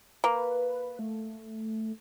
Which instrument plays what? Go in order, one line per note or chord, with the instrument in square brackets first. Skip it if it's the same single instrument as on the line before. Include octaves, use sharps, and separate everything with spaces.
[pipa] A#3 [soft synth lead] B4
[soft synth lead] A3